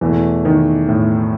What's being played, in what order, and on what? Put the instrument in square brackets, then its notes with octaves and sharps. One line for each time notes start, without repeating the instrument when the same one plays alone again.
[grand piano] E2 B2 A3 [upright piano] E3
[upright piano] D#3
A2